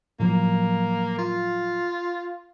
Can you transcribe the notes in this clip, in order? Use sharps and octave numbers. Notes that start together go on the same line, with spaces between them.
A2 F3 F#3 A#3
F4